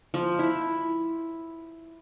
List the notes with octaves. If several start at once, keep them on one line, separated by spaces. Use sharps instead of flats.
F3
E4